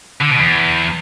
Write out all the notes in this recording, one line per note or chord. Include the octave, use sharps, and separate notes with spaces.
D3
B2
E2